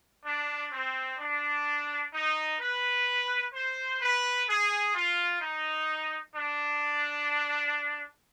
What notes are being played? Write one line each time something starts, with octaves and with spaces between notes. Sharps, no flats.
D4
C4
D4
D#4
B4
C5
B4
G#4
F4
D#4
D4